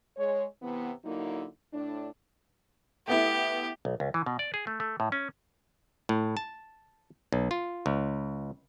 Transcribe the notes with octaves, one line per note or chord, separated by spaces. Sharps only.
G#3 C#5
C3 E3 B3
D3 F#3 A#3 D#4 E4
A2 D4
A3 B3 E4 G4
B1
C#2
E3
B2
D5
G#4
A3
A3
A2
C#4
A2
A5
B1
F4
C#2